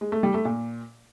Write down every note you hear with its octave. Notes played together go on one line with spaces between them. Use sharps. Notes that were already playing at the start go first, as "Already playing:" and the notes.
G#3
A3
G3
A3
A#2